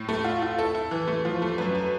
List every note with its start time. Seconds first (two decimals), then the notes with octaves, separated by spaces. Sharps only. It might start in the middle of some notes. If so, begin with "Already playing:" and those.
Already playing: A2
0.09 A3
0.24 F4
0.42 F4
0.58 E4 A4
0.75 E4
0.91 E3
1.08 A3
1.25 F3
1.42 A3
1.58 F#2 B4
1.75 B4